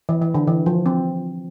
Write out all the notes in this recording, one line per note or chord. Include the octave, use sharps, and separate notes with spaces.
E3
E3
D3
E3
F3
C4